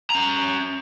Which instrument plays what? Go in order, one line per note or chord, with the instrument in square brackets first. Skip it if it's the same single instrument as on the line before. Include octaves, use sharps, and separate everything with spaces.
[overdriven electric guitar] C#4 A#5